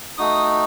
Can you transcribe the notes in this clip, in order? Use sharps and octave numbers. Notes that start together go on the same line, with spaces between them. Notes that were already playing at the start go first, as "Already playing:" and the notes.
A3 D#4 F#4 D#6